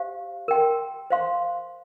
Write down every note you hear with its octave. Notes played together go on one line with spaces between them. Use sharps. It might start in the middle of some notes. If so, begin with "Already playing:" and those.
Already playing: G4 C5 F5
A#4 G5 C6
C5 F5 C6